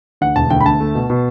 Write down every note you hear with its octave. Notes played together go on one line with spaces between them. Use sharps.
D2 F#5
E1 A5
D2 G5
B5
D2 A5
A3
B2
B2